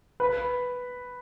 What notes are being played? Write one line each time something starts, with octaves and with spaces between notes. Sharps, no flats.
B4